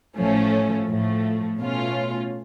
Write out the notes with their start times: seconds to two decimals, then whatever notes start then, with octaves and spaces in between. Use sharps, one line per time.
0.18 A1 A2 F3 A3 C#4
0.87 A2 F3 A3
1.57 B2 A3 C#4 F4